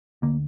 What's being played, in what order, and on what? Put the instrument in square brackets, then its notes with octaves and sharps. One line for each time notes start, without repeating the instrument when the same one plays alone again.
[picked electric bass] D2 D3 A#3